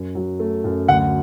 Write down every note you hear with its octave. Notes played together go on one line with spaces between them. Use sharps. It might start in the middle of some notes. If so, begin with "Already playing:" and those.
Already playing: F#2
F#3
A3
F#2
D2 F#5